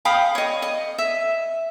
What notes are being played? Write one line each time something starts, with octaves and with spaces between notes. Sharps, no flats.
F5 G5 B5 D#6
C#5 D#5
D#5
E5